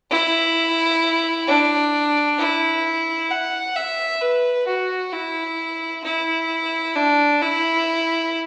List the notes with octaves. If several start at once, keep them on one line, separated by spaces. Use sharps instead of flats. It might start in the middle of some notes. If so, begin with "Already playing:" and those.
E4
D4
E4
F#5
E5
B4
F#4
E4
E4
D4
E4